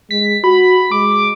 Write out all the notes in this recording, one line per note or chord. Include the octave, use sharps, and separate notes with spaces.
G#3 B6
F#4 B5
G#3 D6